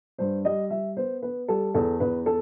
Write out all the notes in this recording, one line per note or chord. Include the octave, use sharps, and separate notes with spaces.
G2 C5
G3 D#5
G3 E5
B3 C5
B3 B4
G3 A4
E2 A4
E2 B4
A4